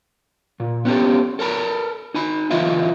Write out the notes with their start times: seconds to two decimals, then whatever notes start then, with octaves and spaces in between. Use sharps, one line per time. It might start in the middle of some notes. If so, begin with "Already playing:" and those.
0.60 A#2
0.85 B3 C#4 F4 G4 A4
1.39 A4 A#4 A5 B5
2.14 D#4 G#5 B5
2.51 C#2 E3 E4 F4 D#5 E5